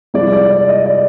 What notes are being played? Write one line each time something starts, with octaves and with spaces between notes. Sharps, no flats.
C2 C3 F3 G#3 D5
D5
D5
D#5
D5